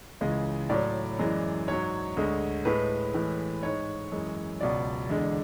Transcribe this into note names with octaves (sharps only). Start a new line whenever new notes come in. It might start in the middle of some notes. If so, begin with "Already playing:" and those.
C#2 C#3 E3 G#3
A2 F#3 D5
F#2 E3 G#3
G#2 F#3 C#5
D2 D3 G#3
A2 G#3 B4
A2 E3 G#3
G#2 G#3 C#5
F#2 E3 G#3
C#2 B2 F#3 D5
E2 D3 G#3